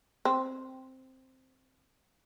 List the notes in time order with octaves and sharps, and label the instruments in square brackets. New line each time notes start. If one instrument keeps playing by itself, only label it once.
[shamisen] C4